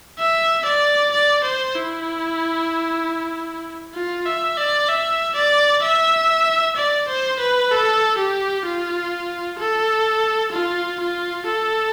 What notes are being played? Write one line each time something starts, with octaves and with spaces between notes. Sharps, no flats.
E5
D5
D5
C5
E4
F4
E5
D5
E5
D5
E5
D5
C5
B4
A4
G4
F4
A4
F4
F4
A4